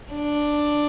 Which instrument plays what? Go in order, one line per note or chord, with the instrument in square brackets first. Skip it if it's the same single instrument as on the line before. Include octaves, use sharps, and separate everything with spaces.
[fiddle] D4